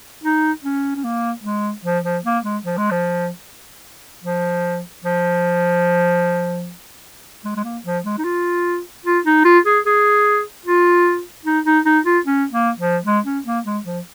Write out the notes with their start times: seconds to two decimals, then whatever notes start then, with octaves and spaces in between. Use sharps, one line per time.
0.24 D#4
0.63 C#4
0.96 C#4
1.04 A#3
1.44 G#3
1.85 F3
2.04 F3
2.25 A#3
2.44 G#3
2.65 F3
2.77 G#3
2.91 F3
4.24 F3
5.04 F3
7.45 G#3
7.56 G#3
7.64 A#3
7.84 F3
8.05 G#3
8.18 D#4
8.24 F4
9.05 F4
9.26 D#4
9.45 F4
9.65 G#4
9.86 G#4
10.66 F4
11.45 D#4
11.66 D#4
11.85 D#4
12.05 F4
12.26 C#4
12.52 A#3
12.79 F3
13.05 G#3
13.25 C#4
13.46 A#3
13.65 G#3
13.85 F3